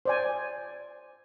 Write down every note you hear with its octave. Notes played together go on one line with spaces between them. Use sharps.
C5 D5 G#5